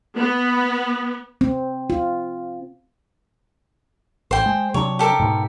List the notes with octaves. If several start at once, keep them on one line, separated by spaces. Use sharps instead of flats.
B3
C4
F4
A1 C5 G5
G#3
C3 F#3 D4 C#5
G4 A4 A#4
G#2 B2